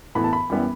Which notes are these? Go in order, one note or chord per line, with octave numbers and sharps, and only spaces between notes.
A2 E3 B3 B5
A5
B5
F#2 E3 G3 B3